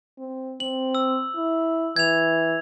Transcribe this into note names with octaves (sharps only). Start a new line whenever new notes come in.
C4
C4 F#7
E6
E4
E3 G#6 F7